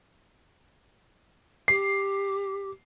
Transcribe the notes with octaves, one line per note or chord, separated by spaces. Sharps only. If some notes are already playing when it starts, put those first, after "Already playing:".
G4 C7